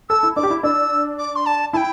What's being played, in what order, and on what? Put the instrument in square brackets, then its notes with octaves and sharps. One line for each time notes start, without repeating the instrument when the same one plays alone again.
[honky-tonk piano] A4 [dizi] E6
[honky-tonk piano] E4
[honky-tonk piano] D4 [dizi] D6
[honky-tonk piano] G4
E4
[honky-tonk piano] D4 [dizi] E6
[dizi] D6
C6
A5
[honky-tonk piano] E4 [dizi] G5 A5